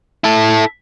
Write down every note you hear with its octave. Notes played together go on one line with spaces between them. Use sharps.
E4 A4